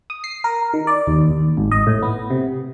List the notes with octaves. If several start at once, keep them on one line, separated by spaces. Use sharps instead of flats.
D#6
C7
A#4
D#3
D5
D#2
D#2
G#1
D#5
A2
B3
C3